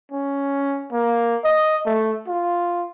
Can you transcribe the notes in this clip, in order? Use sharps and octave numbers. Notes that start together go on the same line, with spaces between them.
C#4
A#3
D#5
A3
F4